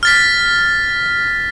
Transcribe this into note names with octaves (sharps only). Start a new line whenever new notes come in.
F6 A6 B6